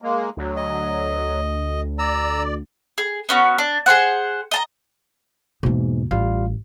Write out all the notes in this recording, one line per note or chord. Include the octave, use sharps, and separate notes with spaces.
G#3 A#3
D2 F#3
D#5
D5 A#5 E6
G#4
B3 C#4 F#4
D4
G#4 A4 C5 F#5
D#5 A5 A#5
E2 G#2 B2 A#3
A1 G3 F4 F5